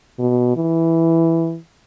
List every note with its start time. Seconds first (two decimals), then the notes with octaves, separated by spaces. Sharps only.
0.19 B2
0.56 E3